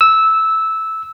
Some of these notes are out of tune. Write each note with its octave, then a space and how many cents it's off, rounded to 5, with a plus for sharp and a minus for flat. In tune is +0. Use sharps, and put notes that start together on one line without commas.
E6 -10